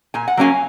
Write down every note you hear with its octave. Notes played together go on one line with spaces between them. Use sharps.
A#2 G#5
F#5
F#3 A#3 C#4 F5 G#5